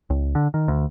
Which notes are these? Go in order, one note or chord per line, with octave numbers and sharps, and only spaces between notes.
C#2
D3
D#3
D2